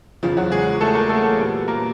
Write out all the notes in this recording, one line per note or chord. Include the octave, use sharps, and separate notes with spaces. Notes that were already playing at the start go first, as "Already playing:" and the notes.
E2 C#3 F3 F4
F#3 F#4
G#3 G#4
A3 A4
A#3 A#4
A3 A4
A#2 G3 B3
A#3 A#4